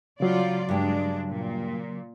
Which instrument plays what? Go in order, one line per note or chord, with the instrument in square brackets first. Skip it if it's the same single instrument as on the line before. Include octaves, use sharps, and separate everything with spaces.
[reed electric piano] C#3 F#3 [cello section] G3 F4 D5
[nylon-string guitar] G2 G4 [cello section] G#3 D4
[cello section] A#2